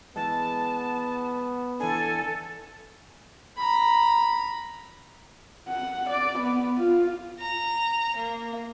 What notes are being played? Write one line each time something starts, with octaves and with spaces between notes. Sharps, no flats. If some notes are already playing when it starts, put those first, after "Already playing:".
E3 G#3 B3 A5
E3 D4 A4 G#5
A#5 B5
F#5
D5
B3
F4
A#5
A#3